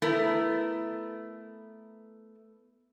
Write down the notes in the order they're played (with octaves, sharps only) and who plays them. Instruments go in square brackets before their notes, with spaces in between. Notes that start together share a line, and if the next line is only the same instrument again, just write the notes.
[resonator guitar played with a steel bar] A3 B3 E4 A#4